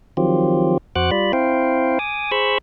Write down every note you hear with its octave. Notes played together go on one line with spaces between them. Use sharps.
D#3 F3 F#3 C4 F4 G4
F2 F#4 C5 F#5 D6 F#6
G3 F4 D5 B5
C4 E4 C5 F5 G5
G#5 D6 D#6
G#4 C5 B5 C#6 E6